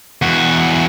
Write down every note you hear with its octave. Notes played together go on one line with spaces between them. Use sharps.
E2 F#4